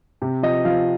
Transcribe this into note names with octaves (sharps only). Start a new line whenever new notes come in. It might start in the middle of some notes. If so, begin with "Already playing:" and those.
C3
F3 D#5
F3 F5